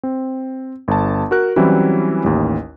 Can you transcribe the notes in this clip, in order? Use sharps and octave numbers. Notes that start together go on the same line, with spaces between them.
C4
G1 A5
F#4 A#4 F#6
E3 F#3 G3 C4 C#4 E4
A1 D#2